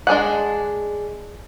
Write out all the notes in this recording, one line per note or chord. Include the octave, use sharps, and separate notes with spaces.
G#3 D4 G#4 F#5